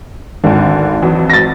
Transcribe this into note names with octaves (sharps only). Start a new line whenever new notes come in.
G#1 D2 D3
F2 E3 F#3
A6 A#6